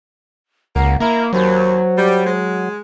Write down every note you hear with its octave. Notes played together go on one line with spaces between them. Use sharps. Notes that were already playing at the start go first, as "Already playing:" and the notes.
C#2 A#3 F#5
A#3 E4 A#4 E5
D#2 F#3 C5
G3
G#3